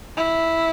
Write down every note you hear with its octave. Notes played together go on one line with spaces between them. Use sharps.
E4